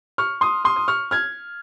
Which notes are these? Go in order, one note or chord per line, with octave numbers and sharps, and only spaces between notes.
C#6 F6
C6 D#6
C6 D#6
D#6
C#6 F6
F6 G#6